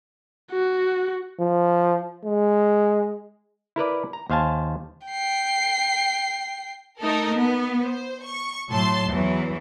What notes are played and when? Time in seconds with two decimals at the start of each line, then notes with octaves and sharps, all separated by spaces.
0.52 F#4
1.40 F3
2.25 G#3
3.76 E4 A#4 B4 D5
4.13 A#5
4.30 D#2 C5 F5 G#5 A5
5.07 G5 C7
7.03 A3 D#4 A4 A#4
7.34 B3
7.83 C5
8.25 C#6
8.70 A2 F#3 A5 C6
9.10 E2 E3 F#3